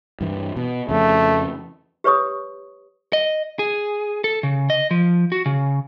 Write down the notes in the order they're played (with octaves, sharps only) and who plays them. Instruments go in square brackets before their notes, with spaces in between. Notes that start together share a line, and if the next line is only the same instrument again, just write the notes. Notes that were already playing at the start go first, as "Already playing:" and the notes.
[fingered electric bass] G2 E3
B2
[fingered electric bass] F2 C#3 [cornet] A3
[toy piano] G4 B4 C#5 C#6 D#6
[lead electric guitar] D#5
G#4
A4
C#3
D#5
F3
F#4
C#3